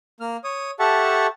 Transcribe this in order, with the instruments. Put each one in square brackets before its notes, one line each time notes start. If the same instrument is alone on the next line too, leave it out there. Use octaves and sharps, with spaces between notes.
[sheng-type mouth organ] A#3 F6
C#5 D#6
G4 A4 E5 F#5 A5 C#6